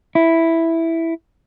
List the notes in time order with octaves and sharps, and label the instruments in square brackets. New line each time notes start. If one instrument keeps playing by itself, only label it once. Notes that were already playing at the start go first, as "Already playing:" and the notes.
[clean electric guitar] E4